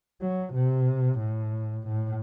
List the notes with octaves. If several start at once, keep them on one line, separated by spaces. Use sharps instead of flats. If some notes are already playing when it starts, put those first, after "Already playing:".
F#3
C3
A2
A2